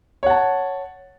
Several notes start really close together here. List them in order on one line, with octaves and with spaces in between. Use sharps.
C#5 F#5 A5